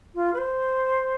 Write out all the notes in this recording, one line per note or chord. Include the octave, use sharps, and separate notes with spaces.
F4
B4
C5